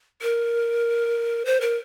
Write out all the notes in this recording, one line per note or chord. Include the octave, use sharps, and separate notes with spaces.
A#4
C5
A#4